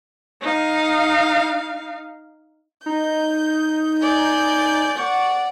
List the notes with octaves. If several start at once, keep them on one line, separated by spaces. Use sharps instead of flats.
D#4 F5
D#4 G6
D5 G#5 G6
D5 F#5 C#6